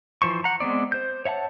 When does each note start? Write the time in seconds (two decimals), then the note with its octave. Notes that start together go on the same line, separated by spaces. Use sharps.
0.22 E3 F3 C5 C#6
0.44 F#5 A#5
0.60 G#3 B3 C4 D5
0.92 C5 G6
1.25 C#5 E5 F#5 A5